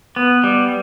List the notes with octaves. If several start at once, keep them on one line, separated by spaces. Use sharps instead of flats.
B3
G3